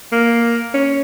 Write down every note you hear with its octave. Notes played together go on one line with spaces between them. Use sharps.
A#3
C#4